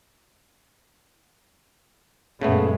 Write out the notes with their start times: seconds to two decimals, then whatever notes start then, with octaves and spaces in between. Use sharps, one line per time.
2.41 F#2 A#2 C#3 G#3 A3 B3